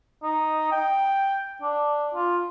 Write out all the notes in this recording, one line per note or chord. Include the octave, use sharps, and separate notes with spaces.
D#4
G5
D4
F4